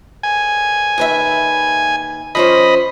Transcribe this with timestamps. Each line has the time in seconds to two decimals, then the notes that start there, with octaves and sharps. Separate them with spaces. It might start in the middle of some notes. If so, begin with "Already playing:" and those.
0.23 G#5
0.98 D#2 B4 E5
2.35 F3 C#4 C5 D#5 B5